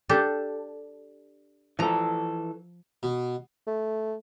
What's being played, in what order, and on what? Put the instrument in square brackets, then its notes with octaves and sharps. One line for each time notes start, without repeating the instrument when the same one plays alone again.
[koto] D4 G4 A4
[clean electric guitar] E3 A4 [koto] F3 A#5
[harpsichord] B2
[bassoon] A3